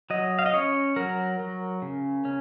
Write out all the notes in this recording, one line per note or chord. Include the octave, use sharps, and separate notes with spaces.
F#3 D#5
F5
D#5
C#4 C#5
F#3 A#4
F#3
C#3
C#4